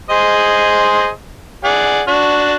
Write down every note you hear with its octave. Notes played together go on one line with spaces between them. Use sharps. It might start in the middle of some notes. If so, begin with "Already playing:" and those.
G#4 C5 D#5
G#4 D5 F#5
D4 F#4